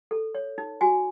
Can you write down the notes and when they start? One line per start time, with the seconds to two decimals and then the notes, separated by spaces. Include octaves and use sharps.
0.11 A4
0.35 C#5
0.58 D#4
0.81 F#4 G#5